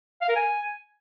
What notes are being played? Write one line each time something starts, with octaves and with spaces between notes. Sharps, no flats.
F5
A#4
G#5